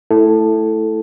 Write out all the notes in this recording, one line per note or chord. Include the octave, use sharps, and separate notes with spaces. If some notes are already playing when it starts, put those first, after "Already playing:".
A3 E4 A4